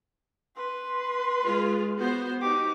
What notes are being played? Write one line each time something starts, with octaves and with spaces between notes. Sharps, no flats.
B4 C6
G#3 F4 G#4
B3 F#4 C5
D#4 F#4 G4 D6